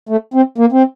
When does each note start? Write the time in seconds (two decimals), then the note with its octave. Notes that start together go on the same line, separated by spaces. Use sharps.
0.09 A3
0.34 C4
0.58 A#3
0.72 C4